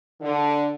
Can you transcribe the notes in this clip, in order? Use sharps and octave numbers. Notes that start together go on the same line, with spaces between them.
D3